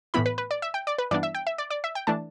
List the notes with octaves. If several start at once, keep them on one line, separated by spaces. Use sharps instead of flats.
A2 E3 B3 E4 B5
B4
B4
D5
E5
G5
D5
B4
G2 E3 B3 D4 D5
E5
G5
E5
D5
D5
E5
G5
E3 A3 D4 A5